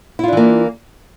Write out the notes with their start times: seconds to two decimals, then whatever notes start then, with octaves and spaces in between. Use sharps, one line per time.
0.19 E4
0.24 F4
0.28 D4
0.33 E3
0.37 A#3